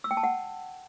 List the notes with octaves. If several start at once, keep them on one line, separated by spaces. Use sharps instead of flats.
E6
G5
A5
F#5